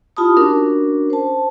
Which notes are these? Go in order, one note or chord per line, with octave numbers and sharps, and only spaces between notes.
E4 F4 G4 A5 B5 D#6
C#4 D4 F#4 A#4
C5 A5